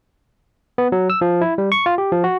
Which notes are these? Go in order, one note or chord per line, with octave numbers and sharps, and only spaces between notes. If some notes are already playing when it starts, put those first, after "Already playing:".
B3
F#3
E6
F3
E4
G3
C#6
F4
G4
F3
F#4